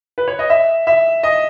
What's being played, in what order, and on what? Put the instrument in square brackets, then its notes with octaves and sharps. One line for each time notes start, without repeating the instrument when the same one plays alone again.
[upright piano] B4
C#5
D#5
E5
E5
D#5